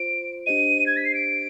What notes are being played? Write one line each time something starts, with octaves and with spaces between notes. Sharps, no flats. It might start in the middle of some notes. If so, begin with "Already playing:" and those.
Already playing: F4 C5 D7
D4 G4 C5 D#5 D#7
G#6
B6
C7
D7